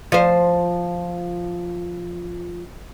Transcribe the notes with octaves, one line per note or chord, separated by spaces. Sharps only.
F3 C5